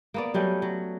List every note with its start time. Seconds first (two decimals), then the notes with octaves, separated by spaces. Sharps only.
0.14 A#3 B3 D5
0.34 F#3 G3 A3 C#4
0.62 F#3